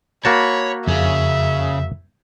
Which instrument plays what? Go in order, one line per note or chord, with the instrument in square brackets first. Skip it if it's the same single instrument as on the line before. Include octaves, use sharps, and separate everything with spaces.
[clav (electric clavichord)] A#3 F#4 A5 [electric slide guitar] C#5 [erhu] B5
[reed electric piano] F2 [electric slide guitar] C#3 G#4 [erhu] E5